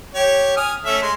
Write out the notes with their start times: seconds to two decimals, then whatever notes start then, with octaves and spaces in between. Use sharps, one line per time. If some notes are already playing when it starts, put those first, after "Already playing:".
0.15 G4 C#5
0.57 G#5 D#6 F6
0.85 A3 C#4 E5
1.03 G#3 C6